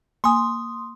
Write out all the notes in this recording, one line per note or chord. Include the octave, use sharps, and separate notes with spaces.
A#3 G#5 C6 D#6